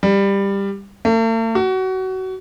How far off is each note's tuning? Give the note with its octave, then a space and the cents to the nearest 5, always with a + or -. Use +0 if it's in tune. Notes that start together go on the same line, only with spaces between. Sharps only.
G3 +15
A3 +45
F#4 +25